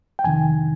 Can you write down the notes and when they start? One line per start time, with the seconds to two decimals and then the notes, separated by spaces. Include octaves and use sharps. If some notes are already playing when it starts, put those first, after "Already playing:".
0.19 G5
0.24 F2 C3 D#3 G#5